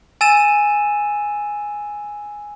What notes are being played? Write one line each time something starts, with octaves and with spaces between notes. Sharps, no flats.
G#5 E6 A6 D#7 E7